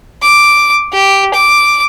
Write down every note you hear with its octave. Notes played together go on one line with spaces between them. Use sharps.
D6
G4
D6